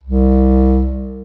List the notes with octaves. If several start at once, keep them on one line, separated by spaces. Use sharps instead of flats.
C2